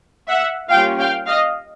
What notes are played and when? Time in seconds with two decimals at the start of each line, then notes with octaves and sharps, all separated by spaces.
0.28 E5 F#5
0.70 G3 A#3 C#4 F4 F5 G5
0.99 F5 G5
1.27 D#5 F5